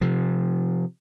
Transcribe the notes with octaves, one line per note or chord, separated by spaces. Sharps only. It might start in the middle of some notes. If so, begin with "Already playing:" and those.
C3 F3